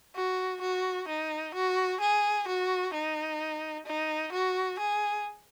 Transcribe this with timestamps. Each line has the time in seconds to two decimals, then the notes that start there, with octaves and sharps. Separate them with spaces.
0.15 F#4
0.62 F#4
1.08 D#4
1.54 F#4
2.01 G#4
2.47 F#4
2.94 D#4
3.86 D#4
4.33 F#4
4.79 G#4